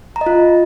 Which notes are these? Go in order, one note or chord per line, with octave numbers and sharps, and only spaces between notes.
A#5
D#5
F4